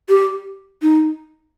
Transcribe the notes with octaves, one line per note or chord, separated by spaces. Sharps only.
G4
D#4